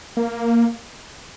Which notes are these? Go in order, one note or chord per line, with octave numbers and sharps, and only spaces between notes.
A#3